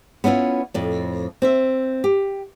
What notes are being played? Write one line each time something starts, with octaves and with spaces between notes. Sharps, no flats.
B3 C#4 D4 E4 F4
F2 A2
C4 C5 E5
G4